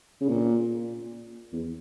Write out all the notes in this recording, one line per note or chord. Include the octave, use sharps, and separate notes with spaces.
C#3
A#2
E2